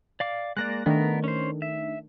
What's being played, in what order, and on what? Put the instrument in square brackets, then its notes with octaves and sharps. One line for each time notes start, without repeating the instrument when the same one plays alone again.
[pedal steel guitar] D5 F5 D6
[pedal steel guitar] G#3 A#3 D5 [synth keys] F#6 A#6
[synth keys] D#3 A3 D4 [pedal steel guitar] B3 A#4
[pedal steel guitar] C#4 C5
E5